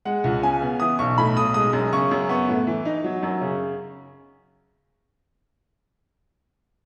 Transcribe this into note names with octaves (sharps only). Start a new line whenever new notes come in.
G#3 F#5
C#2
C#3 G#5
B3
E3 D#6
B1 C#6
A2 B5
B1 D#6
G#3 D#6
F#2
C#3 C#6
F#2
B3 C#6
A2
E3
D#4
F#3
F#2
C#3